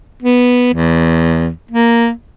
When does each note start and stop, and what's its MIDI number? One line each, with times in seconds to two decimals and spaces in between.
0.22 0.71 59
0.74 1.49 40
1.71 2.10 58